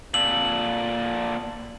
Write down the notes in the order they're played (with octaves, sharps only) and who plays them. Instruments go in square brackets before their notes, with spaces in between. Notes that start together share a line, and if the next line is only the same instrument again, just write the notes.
[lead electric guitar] A#2 A4 [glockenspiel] F#7